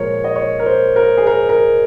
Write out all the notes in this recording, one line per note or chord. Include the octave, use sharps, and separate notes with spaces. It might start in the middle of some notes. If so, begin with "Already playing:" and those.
Already playing: A#2 F3 G#3 A#4 C#5
D#5
C#5
A#4
C5
A#4
G#4
A#4
A#4